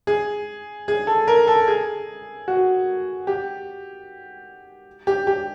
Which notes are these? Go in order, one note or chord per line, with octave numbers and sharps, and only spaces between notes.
G#4
G#4
A4
A#4
A4
G#4
F#4
G4
G4
G4